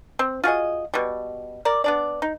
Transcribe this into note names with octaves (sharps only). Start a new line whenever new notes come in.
C4
F4 F#4 G#4 D#5
B2 G3
A#4 D5
B3 D4 D5
D#4